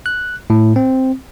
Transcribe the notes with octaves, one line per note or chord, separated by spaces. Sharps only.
F#6
A2
C4